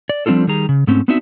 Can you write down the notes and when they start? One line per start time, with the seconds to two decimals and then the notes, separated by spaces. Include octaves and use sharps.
0.09 D5
0.26 F3 G3 C4 D4 F4 A4
0.47 D#3 G3 G#4 A#5
0.69 C#3
0.87 G#2 A3 C4 C#4
1.08 B3 C4 D4 D#4 F#4 E5